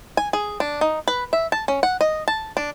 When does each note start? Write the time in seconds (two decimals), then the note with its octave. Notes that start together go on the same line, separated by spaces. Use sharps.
0.17 G#5
0.33 G#4
0.60 D4
0.81 D#4
1.08 B4
1.33 E5
1.52 A5
1.68 C#4
1.83 F#5
2.01 D#5
2.28 A5
2.57 D4